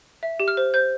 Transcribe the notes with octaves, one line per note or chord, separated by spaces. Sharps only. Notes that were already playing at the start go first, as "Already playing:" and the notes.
E5
G4
F6
C5
C5 G6